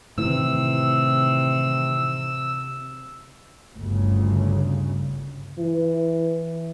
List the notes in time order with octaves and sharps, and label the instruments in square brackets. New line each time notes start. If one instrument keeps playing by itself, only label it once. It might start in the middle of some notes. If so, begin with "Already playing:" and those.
[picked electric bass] A2 D#3 E3 [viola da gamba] C3 [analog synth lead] E6
[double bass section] G1 D2 C#3
[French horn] E3